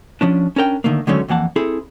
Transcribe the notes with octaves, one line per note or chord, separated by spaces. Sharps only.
F3 C#4 D4
C#4 D4 A#4 G5
D3 D#3 A3 A#3
D3 D#3 F#3 G#3 A3 C#4
F2 E3 A#3 F#5 A5
C4 E4 G#4 A4